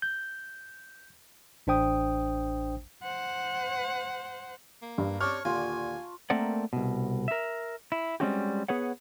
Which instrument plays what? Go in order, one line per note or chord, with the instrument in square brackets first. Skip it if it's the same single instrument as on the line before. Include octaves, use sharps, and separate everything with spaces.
[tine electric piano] G6
A1 D4 C5 G5 D#6
[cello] C5 F#5
[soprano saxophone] A#3
[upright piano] G2
[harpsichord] C4 D4 G4 [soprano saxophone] C#5 [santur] A5 C#6 [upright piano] F6
[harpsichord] D#2 A#2 D3 [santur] F4 [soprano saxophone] G#5
[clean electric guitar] A3 A#3 C4 A#4 D5 F#5
C2 B2
A#4 E5
E4
G3 G#3 C4 C#4 F#4 G4
B3 G#4 B4 C#5 F#5